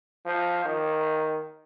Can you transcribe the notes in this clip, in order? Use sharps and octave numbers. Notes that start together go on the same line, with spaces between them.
F3
D#3